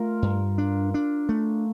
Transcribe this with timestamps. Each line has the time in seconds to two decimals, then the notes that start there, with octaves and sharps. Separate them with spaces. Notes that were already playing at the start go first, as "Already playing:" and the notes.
Already playing: A3 F4 A#4
0.22 G2
0.58 D4
0.94 D4
1.29 A3